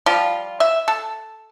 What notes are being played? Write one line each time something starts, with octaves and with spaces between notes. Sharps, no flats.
F3 G3 F4
E5
A4